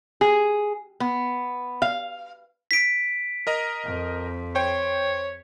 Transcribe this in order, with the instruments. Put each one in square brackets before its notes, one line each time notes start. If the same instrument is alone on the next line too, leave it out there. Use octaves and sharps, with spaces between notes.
[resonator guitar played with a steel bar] G#4
B3
F5
[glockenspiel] B6 D7
[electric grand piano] A#4 D#5 A#5
[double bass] F2
[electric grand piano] C5 G5 [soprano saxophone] C#5